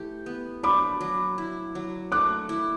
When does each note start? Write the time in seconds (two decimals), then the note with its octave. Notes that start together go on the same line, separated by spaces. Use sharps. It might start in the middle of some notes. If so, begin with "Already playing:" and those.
Already playing: E3 A3 G4
0.26 B3
0.63 D4 B5 D6
1.01 F#3
1.38 E4
1.75 F#3
2.12 A3 D6 F#6
2.49 E4